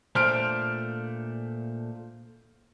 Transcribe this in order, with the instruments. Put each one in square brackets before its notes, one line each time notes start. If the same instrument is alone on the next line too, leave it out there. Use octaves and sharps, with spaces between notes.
[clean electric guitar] A#2 A3 D4 [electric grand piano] C5 F6 D7